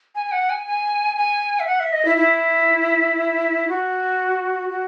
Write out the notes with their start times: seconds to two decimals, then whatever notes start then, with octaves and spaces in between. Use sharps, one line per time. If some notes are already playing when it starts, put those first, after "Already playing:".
0.15 G#5
0.26 G#5
0.32 F#5
0.50 G#5
0.66 G#5
1.17 G#5
1.60 E5
1.67 F#5
1.80 E5
1.93 D#5
2.05 E4
2.17 E4
3.69 F#4
4.69 F#4